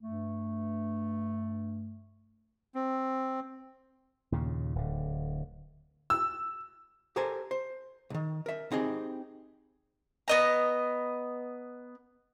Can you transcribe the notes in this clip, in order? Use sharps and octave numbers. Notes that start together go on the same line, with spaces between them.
G2 A3
C4
D#2 A#2 C#3
D1 D3
E6
G4 A4 A#4 C5 G#5
C5
C2 D#3
A#4 E5
C4 D#4 G4 G#4
B3 D#5 A#5